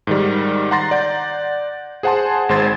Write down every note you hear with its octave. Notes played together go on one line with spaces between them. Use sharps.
G#2 D#3 G3
F#5 A#5 C6 A6 A#6
D5 F#5 G6
G#4 C5 F#5 G#5 A5 C6
G#1 G#3 C5 C6 G#6 A6